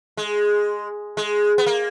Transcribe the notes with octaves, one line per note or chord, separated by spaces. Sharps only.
G#3
G#3
B3
A#3